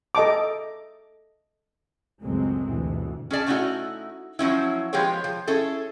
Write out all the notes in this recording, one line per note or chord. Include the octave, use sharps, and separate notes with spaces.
A4 D#5 A5 D6
C#2 F#2 A2 F#3 G#3 C4
G1 D2 B2 E3
C#4 G#4 D5 A5
A3 B3 C#4 D#4 E4 F#4
F3 F#3 C#4 E4
F3 G#3 B3 G4 G#4 C#5
F3
C#4 E4 G#4 A4